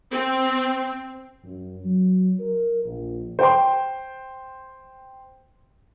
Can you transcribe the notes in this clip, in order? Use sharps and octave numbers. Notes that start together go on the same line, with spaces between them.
C4
F#2
F#3
A#4
A#1
C5 G5 C6